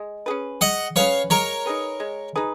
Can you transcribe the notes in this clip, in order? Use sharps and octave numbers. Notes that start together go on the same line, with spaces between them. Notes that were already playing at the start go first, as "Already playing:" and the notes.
Already playing: G#3
C#4 G#4 B4
G#3 D#5 F#5
C#4 G#4 B4 C#5 F5
G#3 A#4 C#5
D#4 G#4 B4
G#3
D#4 G#4 B4